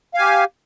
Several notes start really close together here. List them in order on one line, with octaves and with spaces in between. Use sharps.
F5 G#5 G4